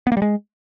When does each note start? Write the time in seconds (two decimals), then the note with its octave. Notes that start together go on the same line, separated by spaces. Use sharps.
0.07 B3
0.12 A#3
0.17 G3
0.22 G#3